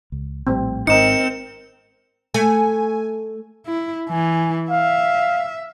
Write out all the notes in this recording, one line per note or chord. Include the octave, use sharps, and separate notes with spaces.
C#2
A#1 A2 G3 C4
G#1 G#2 C4 D#4 A#4 C#7 E7
A3 G#5
E4
E3 G#5
E5 F5